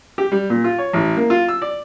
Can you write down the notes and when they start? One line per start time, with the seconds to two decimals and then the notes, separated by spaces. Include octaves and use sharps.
0.18 G4
0.32 G3
0.50 A#2
0.64 F4
0.78 C#5
0.93 A1
1.17 A#3
1.30 F4
1.48 E6
1.62 D5